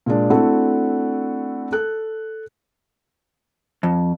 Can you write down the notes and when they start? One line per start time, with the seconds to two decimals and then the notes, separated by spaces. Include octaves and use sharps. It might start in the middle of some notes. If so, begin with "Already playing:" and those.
0.06 A#2 G#3 D4
0.30 A3 C4 D4 E4 F#4
1.72 A4 F#6
3.83 F2